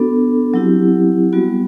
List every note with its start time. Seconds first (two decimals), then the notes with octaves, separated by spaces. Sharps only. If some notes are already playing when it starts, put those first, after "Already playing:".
Already playing: B3 D4 F#4 A4
0.54 F#3 C4 E4 G4
1.33 G3 B3 F#4